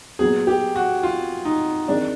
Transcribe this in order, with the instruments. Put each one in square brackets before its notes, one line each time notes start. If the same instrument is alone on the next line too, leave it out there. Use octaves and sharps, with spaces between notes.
[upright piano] A#2 F#3 B3 [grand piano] G#4
[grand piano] G4
F#4
F4
D#4
[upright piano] D#3 G#3 C4 D#4 [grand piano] D4